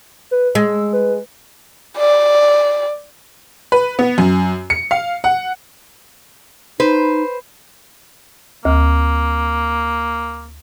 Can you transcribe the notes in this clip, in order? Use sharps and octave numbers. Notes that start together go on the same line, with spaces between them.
B4
G#3 E6
B4
D5
B4
B3
F#2
C#7
F5
F#5
D#4 B4 C5
D2 A#3